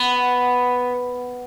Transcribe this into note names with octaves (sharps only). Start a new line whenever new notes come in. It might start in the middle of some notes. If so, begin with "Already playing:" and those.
Already playing: B3